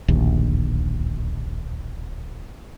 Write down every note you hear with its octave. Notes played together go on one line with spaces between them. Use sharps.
D1 A#1 D#2